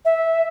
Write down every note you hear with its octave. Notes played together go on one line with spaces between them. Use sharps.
E5